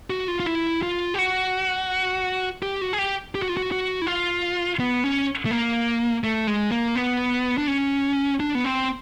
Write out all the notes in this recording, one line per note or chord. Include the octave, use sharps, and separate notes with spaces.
F#4
F4
F4
E4
F4
G4
F#4
G4
F#4
G#4
G4
G4
F#4
F4
F#4
F#4
E4
F4
B3
C#4
A3
A#3
A3
G#3
A#3
B3
D4
C#4
D4
B3
C4